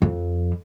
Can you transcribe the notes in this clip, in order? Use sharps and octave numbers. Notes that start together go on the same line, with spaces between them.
F2